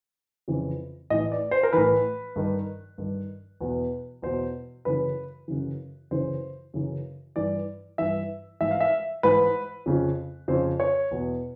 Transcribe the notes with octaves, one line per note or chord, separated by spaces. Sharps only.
F2 C#3 E3
A2 E3 D#5
D5
C5
A#4
A2 E3 B4
G2 D#3
G2 D#3
E2 B2
E2 B2 C5
F#2 C#3 E3 B4
F#2 C#3 E3
F#2 C#3 E3 C5
F#2 C#3 E3
G2 E3 D5
G2 E3 E5
G#2 E3 E5
F5
E5
G#2 E3 B4
F2 C#3 F3
F2 C#3 F3 C5
C#5
E2 B2